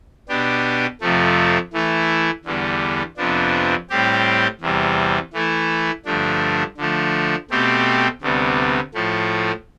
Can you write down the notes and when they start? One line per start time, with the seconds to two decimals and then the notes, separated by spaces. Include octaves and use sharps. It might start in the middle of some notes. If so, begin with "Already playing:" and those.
0.29 B2 B3 D4 G4
1.01 F2 C3 F3 A3
1.73 E3 A3 E4
2.45 E2 D3 G3 B3
3.17 F2 C3 F3 B3 D4
3.90 A2 G3 C4 G4
4.61 E2 C3 G3
5.33 E3 A3 E4
6.05 G2 D3 F3 A3 D4
6.77 D3 F3 A3
7.50 B2 A3 C4 G4
8.22 D2 C3 G3 B3
8.94 A2 F3 A3